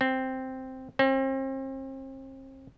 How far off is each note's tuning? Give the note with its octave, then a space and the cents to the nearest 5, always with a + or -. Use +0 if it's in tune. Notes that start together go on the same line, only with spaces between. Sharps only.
C4 +0
C4 +40